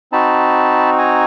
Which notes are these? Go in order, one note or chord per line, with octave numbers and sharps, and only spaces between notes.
C4 D#4 F#4 A5 B5
G#5 A#5